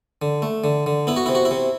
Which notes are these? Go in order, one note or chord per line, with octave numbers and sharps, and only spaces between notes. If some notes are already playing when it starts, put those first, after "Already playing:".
D3
A3
D3
D3
B3 E4
F#4
C3 E4
F#4
E4
C3